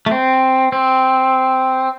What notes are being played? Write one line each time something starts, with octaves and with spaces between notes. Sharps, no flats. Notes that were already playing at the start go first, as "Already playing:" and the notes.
A3
C4
C4